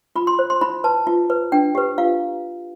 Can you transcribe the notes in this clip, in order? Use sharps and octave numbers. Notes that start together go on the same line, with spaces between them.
F4 B5
C6
C5
C6
E4 B5
B4 A5
F4
B4
D4 G5
G4 B4
F4 F5